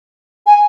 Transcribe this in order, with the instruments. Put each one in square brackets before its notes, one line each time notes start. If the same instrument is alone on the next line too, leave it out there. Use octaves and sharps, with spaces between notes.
[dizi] G#5